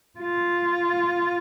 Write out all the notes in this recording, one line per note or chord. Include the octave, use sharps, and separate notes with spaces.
F4